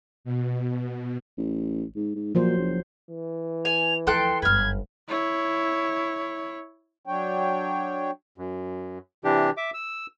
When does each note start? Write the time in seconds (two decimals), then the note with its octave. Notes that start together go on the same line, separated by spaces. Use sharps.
0.24 B2
1.38 A1
1.96 G#2
2.15 G#2
2.35 A#2 F3 F#3 C5
2.58 F#1
3.10 E3
3.65 G#5 F7
4.07 D2 F3 A4 G5 C6 F#6
4.42 G1 F#2 B4 F6 G#6
5.08 E4 C#5
7.06 F#3 D4 C#5 G5
8.38 F#2
9.24 C3 E3 D4 G4
9.57 E5 D6
9.74 E6